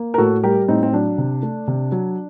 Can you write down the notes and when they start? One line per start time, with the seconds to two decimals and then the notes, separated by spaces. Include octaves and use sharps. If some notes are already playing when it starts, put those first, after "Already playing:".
Already playing: A#3
0.14 A#4
0.18 A2 F#4 A4
0.43 G3 G4 A#4
0.68 A2 C4 D#4
0.83 C4
0.92 F#3 D4
1.18 C3
1.43 A3
1.68 C3
1.92 F#3